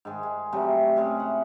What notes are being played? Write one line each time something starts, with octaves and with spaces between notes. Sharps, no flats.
G#2 D#3 G#3
G#3
C3 F#3 G3 A3
C3 G#3 C#4
E4 F#5